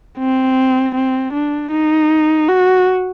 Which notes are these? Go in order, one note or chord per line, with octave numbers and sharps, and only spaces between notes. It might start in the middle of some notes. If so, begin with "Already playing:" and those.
C4
C4
D4
D#4
F#4